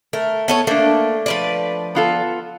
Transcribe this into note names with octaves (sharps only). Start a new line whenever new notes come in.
A3 A#4
B3 A4 C#5
A3 A#3 D4
F3 B4 D5
B3 F4 A4